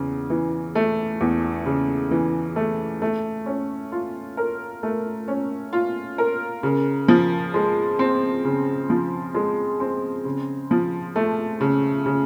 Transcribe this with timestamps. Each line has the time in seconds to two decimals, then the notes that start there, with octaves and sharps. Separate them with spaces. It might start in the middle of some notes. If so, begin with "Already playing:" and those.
Already playing: E2 C#3
0.30 E3
0.75 A3
1.21 E2
1.66 C#3
2.11 E3
2.56 A3
3.02 A3
3.46 C#4
3.92 F4
4.37 A#4
4.83 A3
5.28 C#4
5.73 F4
6.18 A#4
6.63 C#3
7.08 F3
7.54 G#3
7.99 C4
8.45 C#3
8.90 F3
9.35 G#3
9.80 C4
10.25 C#3
10.71 F3
11.16 A3
11.61 C#3
12.06 C#3